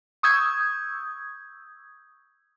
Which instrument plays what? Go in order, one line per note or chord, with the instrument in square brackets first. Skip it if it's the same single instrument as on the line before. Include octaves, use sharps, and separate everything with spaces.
[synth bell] C#6 D#6 E6 G6 G#6